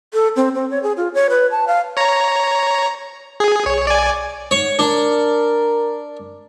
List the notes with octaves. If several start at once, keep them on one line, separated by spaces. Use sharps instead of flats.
A4
C4
C4
C#5
G#4
F4
C#5
B4
A5
F5
C#5 A#5
G#4
B1 C#5
D5 G#5
G#2 C#5
D4 A#4